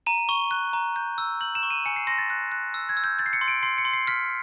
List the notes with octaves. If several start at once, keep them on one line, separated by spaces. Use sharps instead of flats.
A#5 D#7
C#6 G7
F#6
A#5
G6
E6
G6 F#7
E7
C#6
D#7
G#5 C#7
C7
C6 A#6
A6
F#6
F#6
E6
G#6
E6
G6
G6 A6
C7
C#7
C6
D7
C6 C7
C#7
C6
C7
F6 B6